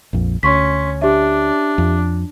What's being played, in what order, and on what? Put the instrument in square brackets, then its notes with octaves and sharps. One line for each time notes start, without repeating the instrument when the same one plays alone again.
[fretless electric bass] A#1 F2
[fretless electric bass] D2 [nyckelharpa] C#4 [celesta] C6 C#6 B6
[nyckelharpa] D4 [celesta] G4 E5
[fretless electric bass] F2